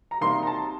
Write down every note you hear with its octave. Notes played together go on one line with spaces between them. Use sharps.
A#5
C3 G3 A#3 D#4 C6
A#5
A5